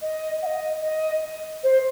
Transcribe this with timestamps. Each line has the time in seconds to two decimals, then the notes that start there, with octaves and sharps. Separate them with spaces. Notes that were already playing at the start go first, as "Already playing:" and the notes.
0.02 D#5
0.42 F#5
0.46 D#5
0.82 D#5
1.63 C5